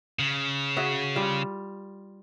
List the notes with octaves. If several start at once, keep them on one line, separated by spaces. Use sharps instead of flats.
C#3
F#4 G#4 E5
G3 F4